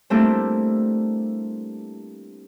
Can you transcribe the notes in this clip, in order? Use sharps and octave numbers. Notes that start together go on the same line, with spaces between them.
G3 A3 A#3 C4 D4 E4